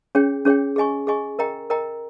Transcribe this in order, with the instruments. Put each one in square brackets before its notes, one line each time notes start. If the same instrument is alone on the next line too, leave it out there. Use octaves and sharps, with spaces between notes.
[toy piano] C#4 G#4 C#5 G5
C#4 G#4 C#5 G5
G#4 D#5 G#5 C#6
G#4 D#5 G#5 C#6
A#4 D#5 G5 A#5
A#4 D#5 G5 A#5